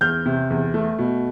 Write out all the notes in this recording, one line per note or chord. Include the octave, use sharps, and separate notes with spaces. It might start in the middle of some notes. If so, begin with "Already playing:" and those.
E2 F6 G6
C3
E2
A3
B2